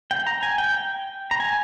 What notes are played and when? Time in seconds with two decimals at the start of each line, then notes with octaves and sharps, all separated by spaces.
0.11 G5
0.27 A#5
0.43 G#5
0.58 G5
0.74 G5
1.31 A#5
1.40 G#5